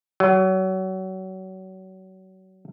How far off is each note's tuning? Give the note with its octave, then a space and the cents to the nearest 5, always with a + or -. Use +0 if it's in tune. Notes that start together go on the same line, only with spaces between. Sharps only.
F#3 +30